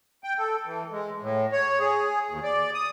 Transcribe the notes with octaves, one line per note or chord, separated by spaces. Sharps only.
G5
A4
E3
G#3
A2
C#5
G#4
D#2
D5
D#6